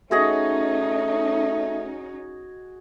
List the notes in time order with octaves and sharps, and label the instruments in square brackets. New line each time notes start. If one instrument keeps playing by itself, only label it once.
[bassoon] A3 [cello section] C#4 D#4 [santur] F#4 G#4 D#5